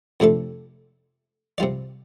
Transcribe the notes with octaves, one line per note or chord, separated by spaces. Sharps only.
F2 C3 A3 D4 A4
C3 G3 F4 D5